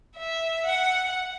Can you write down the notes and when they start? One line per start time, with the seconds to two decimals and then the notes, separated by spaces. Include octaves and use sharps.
0.17 E5
0.66 F#5